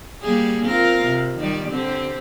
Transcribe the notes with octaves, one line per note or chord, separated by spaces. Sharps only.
G3 A#3 G#4
C4 F4 A#4
C3
D#3 G3 D5
D3 C4 G4